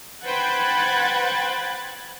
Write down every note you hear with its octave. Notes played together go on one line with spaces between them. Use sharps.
B4 C5 F#5 G5 B5 F#6 G#6 A6